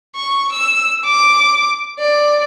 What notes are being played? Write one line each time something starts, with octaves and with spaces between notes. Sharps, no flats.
C#6
E6
D6
D5